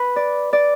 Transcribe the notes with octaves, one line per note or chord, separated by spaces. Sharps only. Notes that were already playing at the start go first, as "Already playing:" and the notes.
Already playing: B4
D5
D5